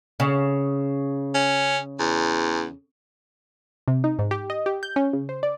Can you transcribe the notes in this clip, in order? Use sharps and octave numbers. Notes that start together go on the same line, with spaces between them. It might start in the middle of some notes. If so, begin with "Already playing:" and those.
C#3
C#4
E2
C3
D#4
G#2
G4
D#5
G4
G6
C#4
C#3
C5
D5